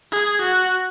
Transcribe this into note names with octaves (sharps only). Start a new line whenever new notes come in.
G#4
F#4